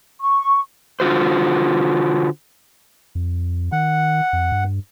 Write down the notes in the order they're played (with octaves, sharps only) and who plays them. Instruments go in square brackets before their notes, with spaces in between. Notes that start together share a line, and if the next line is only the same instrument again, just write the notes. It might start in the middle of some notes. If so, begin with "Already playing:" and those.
[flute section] C#6
[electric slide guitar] D3 F4 F#4 C5
[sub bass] F2
[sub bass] D#3 [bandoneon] F#5
[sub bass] F2
G2